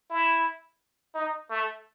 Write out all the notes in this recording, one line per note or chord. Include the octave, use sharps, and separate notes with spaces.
E4
D#4
A3